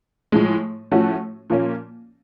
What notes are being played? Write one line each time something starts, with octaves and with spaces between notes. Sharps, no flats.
A2 F3 G#3
A2 F3 A3 C#4 F#4
A#2 F3 A#3 C#4